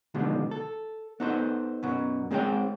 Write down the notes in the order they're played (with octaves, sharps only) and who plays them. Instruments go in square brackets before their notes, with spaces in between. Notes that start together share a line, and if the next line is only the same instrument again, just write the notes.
[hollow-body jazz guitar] B2 D3 D#3 F3 G#3
A4
B3 D#4 A4 C5
F#2 B2 F#3
G#3 C4 G#4 C5 C#5 G5